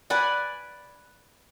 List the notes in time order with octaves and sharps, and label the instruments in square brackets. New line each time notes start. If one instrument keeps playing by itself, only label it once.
[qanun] B4 D5 F#5 G#5